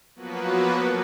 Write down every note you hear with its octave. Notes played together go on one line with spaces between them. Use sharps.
F3 F#3 A#3 B3 F#4 B4